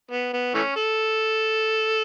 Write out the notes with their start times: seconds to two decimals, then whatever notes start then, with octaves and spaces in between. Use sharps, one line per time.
0.11 B3
0.33 B3
0.54 E3 A3 C#4
0.76 A4